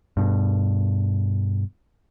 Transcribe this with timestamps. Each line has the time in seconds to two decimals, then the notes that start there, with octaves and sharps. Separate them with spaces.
0.17 G2 B2